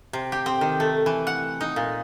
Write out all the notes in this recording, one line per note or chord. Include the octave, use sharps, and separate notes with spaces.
C3
G4
C4
D#3
A3
E3
F#5
D#4
A#2